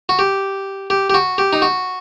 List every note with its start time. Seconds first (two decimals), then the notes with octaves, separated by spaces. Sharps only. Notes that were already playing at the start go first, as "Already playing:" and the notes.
0.09 F#4
0.19 G4
0.90 G4
1.10 G4
1.14 F#4
1.38 G4
1.53 D#4
1.62 F#4